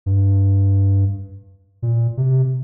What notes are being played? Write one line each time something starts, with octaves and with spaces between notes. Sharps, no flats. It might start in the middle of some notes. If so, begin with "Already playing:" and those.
G2
A#2
C3